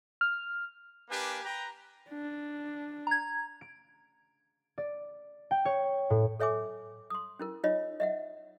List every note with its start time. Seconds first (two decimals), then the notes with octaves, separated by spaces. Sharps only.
0.21 F6
1.10 A#3 D4 G4 B4 G#5
1.44 B4 G5 A#5
2.10 D4
3.07 A#5 G#6
3.61 D7
4.78 D5
5.51 G5
5.65 C#5
6.10 A2
6.40 A4 C#5 E5 G#5 D6
7.10 C6 D#6
7.39 C#4 E4 A#4
7.64 D#4 F4 C#5 D#5
8.00 D#5 E5 F#5